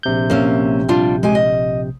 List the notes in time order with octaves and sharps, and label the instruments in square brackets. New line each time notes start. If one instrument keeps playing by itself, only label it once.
[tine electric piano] A#1 C3 G6
[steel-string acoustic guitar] A#3 C#4 E5
G3 D4 F4
G#3 G4 G#5
D#5